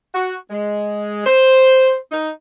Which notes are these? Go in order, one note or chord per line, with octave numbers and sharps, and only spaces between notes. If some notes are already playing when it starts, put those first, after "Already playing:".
F#4
G#3
C5
D#4